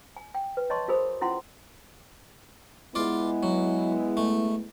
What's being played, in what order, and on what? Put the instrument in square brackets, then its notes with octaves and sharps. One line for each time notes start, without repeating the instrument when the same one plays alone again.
[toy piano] G#5
G5
B4
C#5 D#5 A5 C6 C#6
F#4 G#4 A#4 C5 B5 D#6
C#4 E4 F4 F#5 C6
[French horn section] G#3 B3 E4 [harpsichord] F4 D5
[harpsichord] F#3
A3